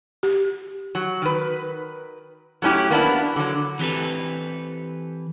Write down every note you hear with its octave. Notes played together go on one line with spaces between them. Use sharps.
G4
F#3
D#3 B4
F#3 A3 C#4 E4 G4
A#3 B3 D4 E4
D3 F#3
E3 C4 G4 A4 B4